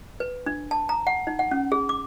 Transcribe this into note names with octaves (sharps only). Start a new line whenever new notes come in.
B4
D4
A5
A#5
F#5
D#4
F#5
C#4
G#4
D6